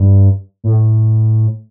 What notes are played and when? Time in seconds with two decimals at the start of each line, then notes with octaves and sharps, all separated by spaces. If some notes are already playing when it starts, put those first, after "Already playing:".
Already playing: G2
0.64 A2